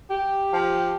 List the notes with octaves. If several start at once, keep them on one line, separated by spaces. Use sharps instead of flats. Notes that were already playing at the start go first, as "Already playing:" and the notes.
G4
F3